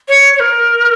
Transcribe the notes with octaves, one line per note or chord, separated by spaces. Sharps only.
C#5
C#5
A#4